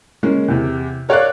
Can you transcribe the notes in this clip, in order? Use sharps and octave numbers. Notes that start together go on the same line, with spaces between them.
G#3 A#3 C#4
E2 C3
A#4 C#5 D5 F5 F#6